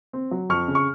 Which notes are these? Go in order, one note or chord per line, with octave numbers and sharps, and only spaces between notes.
C4
F#3
F2 C#6 F6
C#3
C#6